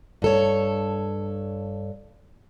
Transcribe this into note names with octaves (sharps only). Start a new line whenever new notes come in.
G2 A4 C#5